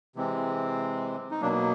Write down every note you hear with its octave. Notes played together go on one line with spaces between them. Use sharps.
C3 E3 G#3 C4
D#4
B2 F#3 A#3 D4